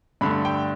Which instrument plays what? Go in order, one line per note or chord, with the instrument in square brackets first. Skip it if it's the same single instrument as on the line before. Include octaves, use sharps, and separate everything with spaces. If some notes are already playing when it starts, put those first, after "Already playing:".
[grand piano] G2 D3 A3 B5
G5